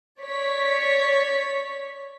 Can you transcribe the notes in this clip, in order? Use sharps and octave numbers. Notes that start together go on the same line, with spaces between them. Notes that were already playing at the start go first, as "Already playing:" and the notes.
C#5 D5 B6